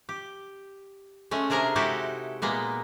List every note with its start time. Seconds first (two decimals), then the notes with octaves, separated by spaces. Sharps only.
0.09 G4
1.31 G#3 A3 C#4
1.50 C3 D4 G#4 A#4 A#5
1.75 G#3 D#4 E4 F#4 G4 A4
2.42 A#2 G#3 A#3 B3